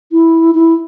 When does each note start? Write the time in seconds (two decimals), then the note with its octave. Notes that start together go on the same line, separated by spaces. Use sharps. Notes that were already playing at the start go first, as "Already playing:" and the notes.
0.12 E4
0.55 E4